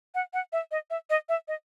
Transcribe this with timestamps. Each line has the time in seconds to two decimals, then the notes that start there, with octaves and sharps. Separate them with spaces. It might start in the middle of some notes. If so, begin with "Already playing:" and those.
0.15 F#5
0.33 F#5
0.53 E5
0.71 D#5
0.90 E5
1.10 D#5
1.29 E5
1.48 D#5